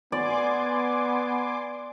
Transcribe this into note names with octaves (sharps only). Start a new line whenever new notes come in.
B3 D5 G#5 C6 D6